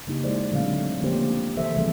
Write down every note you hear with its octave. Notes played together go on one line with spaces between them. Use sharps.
C#3 A#3 D#4 G4
G#3 E4 G#4 C5 D5
A#2 D3 F#3 A3 C4 F5
D3 F3 A#3 C#4 G4 C5
C3 E3 A4 C5 E5
C3 F3 G3 A3 G#4 C5